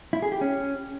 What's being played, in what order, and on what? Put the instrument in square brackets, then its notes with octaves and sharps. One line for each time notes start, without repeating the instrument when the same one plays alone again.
[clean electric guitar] E4
G#4
G4
C#4